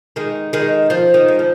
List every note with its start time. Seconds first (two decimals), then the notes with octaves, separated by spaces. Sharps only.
0.16 D#3 G#3
0.53 D#3 G#3
0.90 F3
1.14 D#3
1.28 G#3
1.39 F3